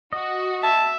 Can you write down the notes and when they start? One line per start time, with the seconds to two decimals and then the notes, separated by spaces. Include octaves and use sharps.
0.13 F#4 D#5
0.63 E5 A5